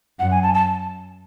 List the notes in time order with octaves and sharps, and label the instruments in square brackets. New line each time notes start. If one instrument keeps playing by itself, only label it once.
[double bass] F#2 [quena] F#5
[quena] G#5
A5
A5